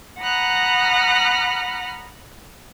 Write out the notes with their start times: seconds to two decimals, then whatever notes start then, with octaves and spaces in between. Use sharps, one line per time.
0.20 F#5 A#5 B5 D#6 F6 F#6